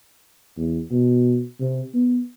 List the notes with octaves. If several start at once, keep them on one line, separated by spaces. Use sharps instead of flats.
E2
B2
C3
B3